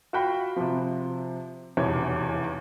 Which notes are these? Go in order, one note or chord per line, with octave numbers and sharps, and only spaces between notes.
F4 F#4 G5 B5
C3 F3
F1 B1 E2 C#5